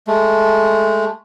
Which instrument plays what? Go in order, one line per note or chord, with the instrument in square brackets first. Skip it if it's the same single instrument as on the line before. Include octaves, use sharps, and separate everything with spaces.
[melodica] G#3 A3